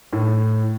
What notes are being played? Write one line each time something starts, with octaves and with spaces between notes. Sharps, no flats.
A2